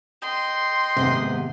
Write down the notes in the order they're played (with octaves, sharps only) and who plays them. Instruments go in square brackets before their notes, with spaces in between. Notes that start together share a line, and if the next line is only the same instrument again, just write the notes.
[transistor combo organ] D#5 G5 [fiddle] C6
[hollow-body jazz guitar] D#2 C3 [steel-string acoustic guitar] G#2 A3 B3